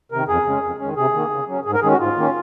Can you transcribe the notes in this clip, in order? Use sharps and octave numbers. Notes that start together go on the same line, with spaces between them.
C3 D#3 A#4
F2 G#4
C#3 G#3 C#4
F2
D#3 G#3 C#4
C3 G#4
D#3 A#3
C#3
F#3 C#4
G#2 G#4
A#4
D#3 G#3 C#4 G#4
F#4
G#2 F4
D#3 A#3 C#4